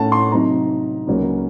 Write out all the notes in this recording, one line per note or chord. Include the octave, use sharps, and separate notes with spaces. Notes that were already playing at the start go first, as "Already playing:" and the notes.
Already playing: A2 A3 C#4 F#5 A5
C6
C3 F#3 C4 D#4 A#5
C#2 C#3 F#3 A#3 C#4